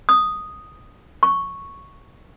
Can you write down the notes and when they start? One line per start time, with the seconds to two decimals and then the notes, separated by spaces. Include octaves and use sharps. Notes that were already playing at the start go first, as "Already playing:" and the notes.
0.09 D#6
1.23 C#6